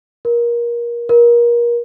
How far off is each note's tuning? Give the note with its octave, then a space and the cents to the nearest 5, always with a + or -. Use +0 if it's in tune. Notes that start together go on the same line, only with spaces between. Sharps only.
A#4 +25
A#4 +30